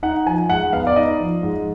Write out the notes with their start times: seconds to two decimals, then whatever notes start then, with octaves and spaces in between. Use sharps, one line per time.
0.03 D#4 F#5
0.26 F3 G#5
0.50 G#2 F#5
0.72 B3 F5
0.87 D5
0.96 D#4 D#5
1.20 F3
1.43 G#2